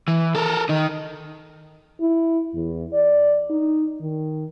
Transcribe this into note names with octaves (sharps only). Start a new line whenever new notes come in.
E3
A4 A#4
D#3 D#4
E4
E2
D5
D#4
D#3